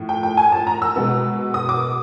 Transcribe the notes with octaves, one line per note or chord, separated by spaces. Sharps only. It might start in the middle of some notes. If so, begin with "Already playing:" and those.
Already playing: A2 F3 A3
G5
G5
G#5
A5
A#5
E6
B2 G#3 B3
D#6
D6